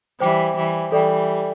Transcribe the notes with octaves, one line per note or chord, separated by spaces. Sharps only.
E3 G3 C5 G5 D6
E3 G3
E3 G3 A4 D5 G5